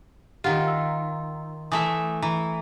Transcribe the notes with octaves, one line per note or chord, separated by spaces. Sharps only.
D#3 F4 G4 F#5
E6
E3 A3 E5 G#5 D#6
E3 A#5